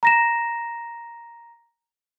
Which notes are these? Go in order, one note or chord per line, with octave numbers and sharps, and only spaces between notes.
A#5 A#6 E7